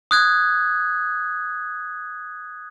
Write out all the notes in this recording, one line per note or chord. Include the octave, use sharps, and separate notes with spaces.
D#6 F#6 G#6